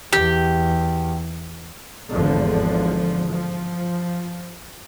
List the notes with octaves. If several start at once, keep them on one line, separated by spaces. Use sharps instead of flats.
E2 G4
G#1 E2 G2 D3 F3
F3